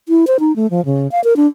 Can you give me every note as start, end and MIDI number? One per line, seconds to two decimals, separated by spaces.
0.09 0.25 64
0.27 0.37 72
0.40 0.55 63
0.56 0.69 57
0.70 0.84 53
0.85 1.10 49
1.12 1.23 77
1.24 1.36 70
1.36 1.47 62